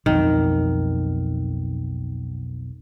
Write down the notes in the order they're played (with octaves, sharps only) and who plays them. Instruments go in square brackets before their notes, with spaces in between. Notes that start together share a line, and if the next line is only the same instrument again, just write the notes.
[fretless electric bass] B1 F2 [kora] D#3